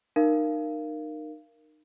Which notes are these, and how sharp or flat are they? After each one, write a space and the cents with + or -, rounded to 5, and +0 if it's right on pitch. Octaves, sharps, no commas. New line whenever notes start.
D#4 -30 A#4 +0 F5 -25